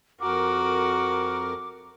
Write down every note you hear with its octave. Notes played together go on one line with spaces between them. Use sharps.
F2 F#4 A#4 D6